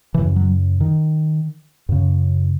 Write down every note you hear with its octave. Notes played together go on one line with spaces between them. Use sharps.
F#2 C#3 E3
F#3
D#3
F#2 C#3